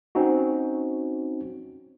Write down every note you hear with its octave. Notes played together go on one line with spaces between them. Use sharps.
C4 C#4 D#4 F#4